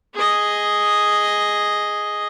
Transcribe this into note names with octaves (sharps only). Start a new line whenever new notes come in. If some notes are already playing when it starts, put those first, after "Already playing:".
G#4 D#5